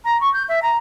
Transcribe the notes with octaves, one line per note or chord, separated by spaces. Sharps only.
A#5
C#6
G6
E5
A#5